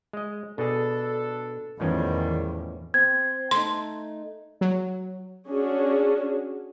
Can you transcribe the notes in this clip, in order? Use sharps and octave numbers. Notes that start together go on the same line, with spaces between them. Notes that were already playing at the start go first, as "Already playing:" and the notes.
G#3 D#5
B2 D4 G#4 A4
E2 A2 D#3 F3 G3 C#4
C4 G#6
A3 D#4 C6
F#3
C#4 D4 F#4 G#4